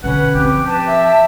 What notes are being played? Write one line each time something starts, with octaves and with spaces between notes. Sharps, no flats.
B2 D3 C#4 B4 F#5
F3 C4 G4
G4 B4 A5
E5